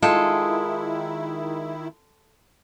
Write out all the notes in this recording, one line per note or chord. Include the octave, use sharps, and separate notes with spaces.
D#3 G#3 E4 F4 A4 G5